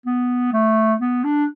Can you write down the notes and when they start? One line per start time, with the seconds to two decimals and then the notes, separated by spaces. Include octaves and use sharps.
0.06 B3
0.52 A3
1.00 B3
1.24 D4